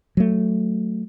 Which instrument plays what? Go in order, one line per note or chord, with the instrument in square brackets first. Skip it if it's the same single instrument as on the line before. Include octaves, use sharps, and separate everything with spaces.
[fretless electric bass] F#3 A3